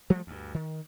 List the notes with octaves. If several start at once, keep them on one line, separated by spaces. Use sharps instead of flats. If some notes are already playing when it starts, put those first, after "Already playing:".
F3 G3 A3
D2 G2
D#3